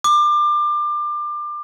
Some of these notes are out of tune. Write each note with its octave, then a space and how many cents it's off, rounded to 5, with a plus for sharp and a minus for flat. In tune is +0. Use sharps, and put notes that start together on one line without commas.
D6 +25